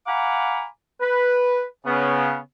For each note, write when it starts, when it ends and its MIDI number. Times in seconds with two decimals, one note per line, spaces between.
0.07 0.65 77
0.07 0.65 78
0.07 0.65 80
0.07 0.65 82
0.07 0.65 83
0.07 0.65 86
1.01 1.62 71
1.86 2.37 49
1.86 2.37 59